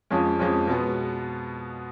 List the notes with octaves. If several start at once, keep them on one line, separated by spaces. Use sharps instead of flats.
F2 F3 G#3 C#4
F2 F3 G#3 C#4
B2 G#3 B3